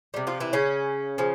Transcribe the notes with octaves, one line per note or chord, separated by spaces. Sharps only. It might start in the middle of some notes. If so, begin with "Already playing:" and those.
C3 G3
F3 F4
E3 E4
C#3 C#4
C#3 F3